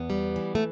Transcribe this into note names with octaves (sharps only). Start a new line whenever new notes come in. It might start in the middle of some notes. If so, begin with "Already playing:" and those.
Already playing: E2 B3
G3
E3
A3